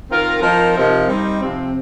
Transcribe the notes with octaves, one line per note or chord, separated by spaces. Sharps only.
D#3 C4 F4 A#4
F3 C4 D#4 A#4
C3 F3 D#4 A#4
G3 C4 D#4
C3 F3 C4